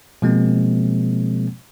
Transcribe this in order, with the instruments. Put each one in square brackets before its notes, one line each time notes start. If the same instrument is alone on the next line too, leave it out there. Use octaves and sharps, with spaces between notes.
[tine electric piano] B2 F3 G#3 A#3 C4